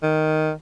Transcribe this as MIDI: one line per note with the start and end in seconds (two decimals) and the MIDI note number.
0.03 0.52 51